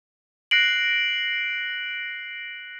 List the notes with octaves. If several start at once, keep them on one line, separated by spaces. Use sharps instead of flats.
F#6 A#6 C7 D7 F#7